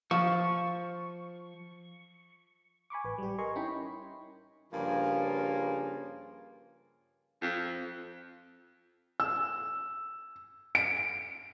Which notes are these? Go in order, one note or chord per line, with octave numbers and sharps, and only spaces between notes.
F3 C#6
G#5 B5 C#6 D6
A1 B4
G3 G4
A#4 D#5 G#5 A#5 C6 C#6
C#4 D#4 E4 G5 B5 C#6
G2 C#3 F3 A#3 F4 G#5
F2
E6
D7